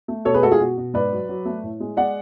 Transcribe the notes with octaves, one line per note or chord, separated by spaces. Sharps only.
A3
B2 A4 C#5
G#4 B4
G#3 F#4 A4
F4 G#4
B2 F#4
B2
G#2 B4 D5
F#3
F#3
A3
A2
G#3
G#3 D5 F#5